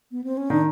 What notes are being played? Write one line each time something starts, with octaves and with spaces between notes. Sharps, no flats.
B3
C4
C#4
D#3 D4